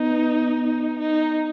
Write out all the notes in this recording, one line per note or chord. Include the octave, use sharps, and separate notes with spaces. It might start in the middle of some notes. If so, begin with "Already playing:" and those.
Already playing: B3 D#4
D#4